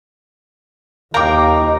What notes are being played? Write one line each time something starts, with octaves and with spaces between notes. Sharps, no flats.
D#2 D#4 A#4 F5 G5 A#5 D6